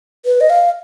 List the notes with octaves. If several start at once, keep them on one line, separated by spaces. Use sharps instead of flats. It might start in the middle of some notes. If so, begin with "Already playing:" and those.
B4
D#5
F5